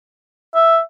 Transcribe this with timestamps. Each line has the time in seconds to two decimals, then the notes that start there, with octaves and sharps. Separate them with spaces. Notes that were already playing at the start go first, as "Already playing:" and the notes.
0.55 E5